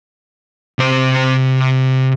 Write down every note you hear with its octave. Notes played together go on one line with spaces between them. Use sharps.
C3 C5